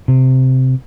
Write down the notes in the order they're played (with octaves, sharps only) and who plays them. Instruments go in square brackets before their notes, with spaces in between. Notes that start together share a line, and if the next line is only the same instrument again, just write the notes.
[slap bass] C3